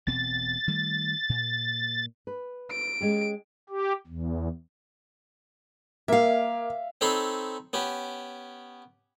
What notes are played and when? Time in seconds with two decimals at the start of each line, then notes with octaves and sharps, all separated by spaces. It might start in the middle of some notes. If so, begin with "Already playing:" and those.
0.07 E1 B2 C4 A6
0.68 D#3 G3 A3
1.29 A#2
2.27 B4
2.71 D7
3.01 G#3 C#4 G4
3.69 G4
4.07 E2
6.08 A#3 E5 F5
7.01 C4 D#4 A4 C#5 B5 C6
7.73 B3 C#4 G4